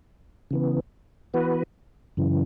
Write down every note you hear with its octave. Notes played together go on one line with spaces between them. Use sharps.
C#3 E3 B3
E3 B3 F#4 B4
F#2 C#3 E3